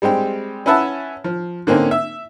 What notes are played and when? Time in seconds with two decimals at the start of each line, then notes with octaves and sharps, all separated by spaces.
0.02 G3 G#3 C4 G4
0.66 C#4 E4 B4 E5 F#5 A5
1.24 F3
1.67 D3 A#3 C4 C#4 D#4
1.91 E5